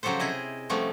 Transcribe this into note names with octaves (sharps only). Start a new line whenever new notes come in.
C#3 F3 F#3 G4 A4 C5
C3 E4 G#4 D#5
C3 F3 G3 A3 B3 C#4